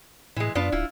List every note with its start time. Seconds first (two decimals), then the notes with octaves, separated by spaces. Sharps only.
0.36 A2 E3 G#3
0.55 F#2 B3 D4 F4
0.72 D1 E4 F4